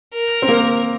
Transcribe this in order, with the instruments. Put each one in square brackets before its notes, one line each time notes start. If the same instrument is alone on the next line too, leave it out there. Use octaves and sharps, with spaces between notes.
[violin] A#4
[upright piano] C4
A#3